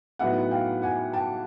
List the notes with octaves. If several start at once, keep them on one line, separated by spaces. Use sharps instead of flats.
A2 F#3 B3 D#4 E5 F#5
F5 G5
F#5 G#5
G5 A5